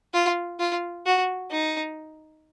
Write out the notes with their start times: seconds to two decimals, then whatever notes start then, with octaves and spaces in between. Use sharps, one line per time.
0.14 F4
0.60 F4
1.06 F#4
1.51 D#4